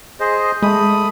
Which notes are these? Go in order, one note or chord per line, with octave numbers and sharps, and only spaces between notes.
G#4 C5 D#5
G#3 A3 B5 D#6